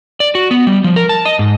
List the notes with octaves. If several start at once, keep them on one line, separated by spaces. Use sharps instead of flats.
D5
F#4
B3
G3
F3
A#4
A5
D#5
G#2